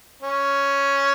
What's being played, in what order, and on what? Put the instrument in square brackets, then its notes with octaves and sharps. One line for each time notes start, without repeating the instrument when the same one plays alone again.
[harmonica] C#4